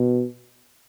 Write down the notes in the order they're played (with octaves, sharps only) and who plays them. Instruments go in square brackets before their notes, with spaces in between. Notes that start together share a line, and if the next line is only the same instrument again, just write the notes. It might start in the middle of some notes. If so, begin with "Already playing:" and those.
Already playing: [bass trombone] B2